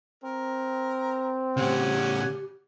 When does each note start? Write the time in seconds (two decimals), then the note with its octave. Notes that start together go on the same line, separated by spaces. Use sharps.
0.24 C4 A#4
1.57 A2 C#3 C#4 G4 F#5 G#5